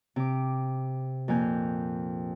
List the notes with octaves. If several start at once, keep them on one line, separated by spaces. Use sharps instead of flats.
C3 D6
F2 A#2 A#3 G#5 G6